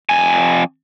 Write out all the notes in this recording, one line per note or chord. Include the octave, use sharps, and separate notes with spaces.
F2 G#5